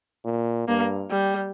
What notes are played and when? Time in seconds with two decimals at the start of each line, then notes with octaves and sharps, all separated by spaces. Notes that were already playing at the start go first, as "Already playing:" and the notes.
0.25 A#2
0.68 G2 A#3
1.10 G3